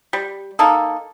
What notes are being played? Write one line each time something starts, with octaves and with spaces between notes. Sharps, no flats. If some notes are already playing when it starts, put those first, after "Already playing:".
G3
A#3 D#4 A4